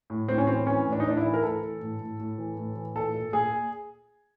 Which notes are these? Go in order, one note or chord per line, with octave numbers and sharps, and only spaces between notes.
A2
A2 C4
C#4
E3 C4
E3 C#4
A2
D4
D#4
A2 D4
E4
E3
A#4
A2 A4
E3
A2
A2
A2
E3
A2
E3
A#2 A4
A#2
A#2 G#4